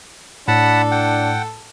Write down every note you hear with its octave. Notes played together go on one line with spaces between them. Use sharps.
A2 D4 A4 F#5 A5 B5
F#5 G5